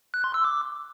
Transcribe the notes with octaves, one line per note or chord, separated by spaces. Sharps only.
F#6
C6
E6
D6